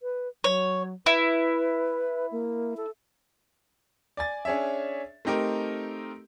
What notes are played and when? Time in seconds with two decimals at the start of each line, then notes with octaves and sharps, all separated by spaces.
0.03 B4
0.44 F#3 C#5
1.06 E4 B4
2.32 A#3
2.77 A4
4.17 D5 G#5 A6
4.45 C#4 D4 G#4 C#5 E5
5.25 A3 C4 D#4 G4 A#4